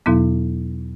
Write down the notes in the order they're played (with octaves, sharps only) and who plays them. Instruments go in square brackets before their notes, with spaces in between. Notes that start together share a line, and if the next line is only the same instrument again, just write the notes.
[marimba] E2 B2 F#3 B3 E4